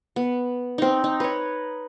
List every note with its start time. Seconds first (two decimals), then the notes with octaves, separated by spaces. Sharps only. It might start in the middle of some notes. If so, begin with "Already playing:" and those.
0.16 B3
0.78 C4 D#4
1.04 D#4
1.20 B4 C#5